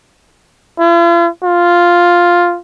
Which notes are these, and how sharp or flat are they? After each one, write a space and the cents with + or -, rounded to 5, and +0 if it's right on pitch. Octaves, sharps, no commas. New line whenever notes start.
F4 -45
F4 +0